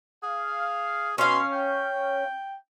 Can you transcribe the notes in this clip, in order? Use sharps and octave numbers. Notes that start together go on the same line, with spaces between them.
G#4 F5
B2 C#4 F5 C6
G5